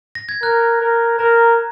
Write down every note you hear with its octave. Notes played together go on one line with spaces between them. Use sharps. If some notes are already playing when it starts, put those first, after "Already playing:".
A#6
G#6
A#4 F#6
A#4
A#4 A#5